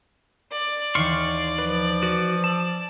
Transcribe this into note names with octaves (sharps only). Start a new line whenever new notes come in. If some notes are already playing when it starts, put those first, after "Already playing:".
D5
D#2 D#3 E3 C6 C#6 F6
F3 B4
F#4 B4 D7
A5 E6 D7 D#7